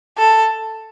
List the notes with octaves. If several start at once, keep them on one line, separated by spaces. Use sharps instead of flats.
A4